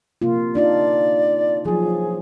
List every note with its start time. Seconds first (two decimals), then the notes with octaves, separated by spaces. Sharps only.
0.22 C3 A#3 F4
0.55 D4 D#4 F4 D5
1.65 F3 F#3 G#4